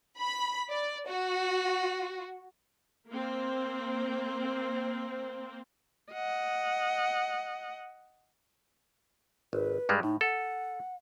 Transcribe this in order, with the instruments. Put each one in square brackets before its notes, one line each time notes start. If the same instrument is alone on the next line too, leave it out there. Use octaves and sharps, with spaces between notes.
[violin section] B5
D5
F#4
[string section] A#3 C4
[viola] D#5 F#5
[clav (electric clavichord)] G#1 [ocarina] B4
[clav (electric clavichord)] G2 G3 G#3
[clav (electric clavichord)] A2 [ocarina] D#4
[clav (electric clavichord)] A4 [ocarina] F#5